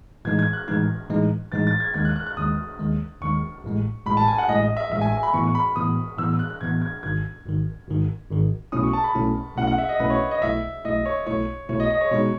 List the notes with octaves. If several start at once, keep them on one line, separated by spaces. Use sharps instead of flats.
A2 E3 G#3 D#4 G#6
G#6
F#6
A2 E3 G#3 D#4 G#6
A2 E3 G#3 D#4
A2 E3 G#3 D#4 A6
A6
G#6
D#2 D#3 G#3 G#6
F#6
F#6
F#6
D#2 D#3 G#3 D#6
D#2 D#3 G#3
D#2 D#3 G#3 C#6
A1 A2 G#3
A1 A2 G#3 B5
A5
G#5
F#5
A1 A2 G#3 D#5
D#5
E5
A1 A2 G#3 E5
G#5
G#5
B5
A2 E3 B3 C#6
C#6
B5
A2 E3 B3 D#6
A2 E3 B3 E6
E6
F#6
F#6
A2 E3 B3 G#6
G#6
G#1 G#2 D#3 G#6
G#1 G#2 D#3
G#1 G#2 D#3
G#1 G#2 D#3
B1 B2 A3 C#4 E4 D#6
C#6
A5
B5
B1 B2 A3 C#4 E4
B1 B2 A3 C#4 E4 F#5
F#5
E5
D#5
B1 B2 A3 C#4 E4 B4
C#5
D#5
B1 B2 A3 E4 E5
B1 B2 A3 E4 D#5
C#5
B1 B2 A3 E4 C#5
B1 B2 A3 E4 C#5
D#5
D#5
C#5
B2 G#3 D#4 C#5